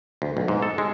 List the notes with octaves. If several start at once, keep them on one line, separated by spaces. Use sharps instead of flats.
D2
B1
G#2
A4
G#3